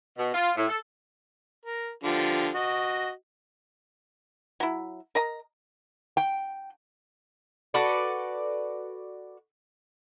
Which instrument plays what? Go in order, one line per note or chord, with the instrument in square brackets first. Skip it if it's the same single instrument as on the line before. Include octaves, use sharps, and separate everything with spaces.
[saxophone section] B2
F4
A2
A4
[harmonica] A#4
D3 F3 G4
F#4 D#5
[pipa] F#3 E4
A#4 D#5 A#5
[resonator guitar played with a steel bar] G5
[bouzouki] F#4 A4 B4 D5